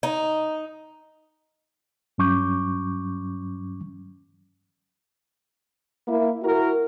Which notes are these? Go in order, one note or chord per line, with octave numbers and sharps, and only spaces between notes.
D#4
G2 F#3 C#4 C#6 D6 G6
A#3 E4
E4 F#4 A#4